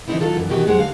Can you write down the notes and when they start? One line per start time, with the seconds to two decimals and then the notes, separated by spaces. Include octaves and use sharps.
0.08 D3 E3 A#3 C4 D#4 E4
0.20 D#3 F#3 F4 A4
0.37 F#2 A#2 E3
0.49 B2 D#3 E3 F#4 G4
0.65 F2 F#3 G#3 C5 F#5
0.78 D#2 D3 F5